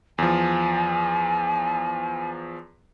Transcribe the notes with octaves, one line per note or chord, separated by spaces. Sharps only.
E2 F3 G#5